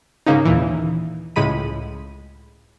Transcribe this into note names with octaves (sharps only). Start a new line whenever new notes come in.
G#2 C#3 A#3 C#4 D#4
D#2 A#2 E3
C#2 A2 G#3 B5 D#7